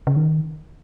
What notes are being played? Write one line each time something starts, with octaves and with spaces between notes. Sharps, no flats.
C#3
D#3